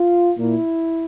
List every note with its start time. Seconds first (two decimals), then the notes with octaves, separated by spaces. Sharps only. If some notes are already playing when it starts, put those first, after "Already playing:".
Already playing: F4
0.37 A#2 E4